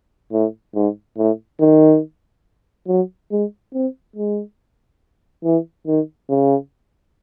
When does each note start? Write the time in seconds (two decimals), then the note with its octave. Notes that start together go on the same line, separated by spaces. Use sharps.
0.32 A2
0.75 G#2
1.18 A2
1.61 D#3
2.88 F#3
3.31 G#3
3.74 C4
4.16 G#3
5.44 E3
5.87 D#3
6.30 C#3